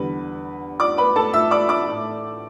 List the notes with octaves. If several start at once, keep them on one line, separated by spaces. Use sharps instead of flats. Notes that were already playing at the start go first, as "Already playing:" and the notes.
Already playing: E2 D3 G3 B4
D5 D6
B4 B5
A4 A5
E5 E6
D5 D6
D5 D6
A2 A3